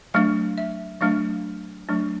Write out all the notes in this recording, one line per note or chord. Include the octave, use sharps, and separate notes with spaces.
F#3 A3 D4 F5
E5
F#3 A3 D4 F5
F#3 A3 D4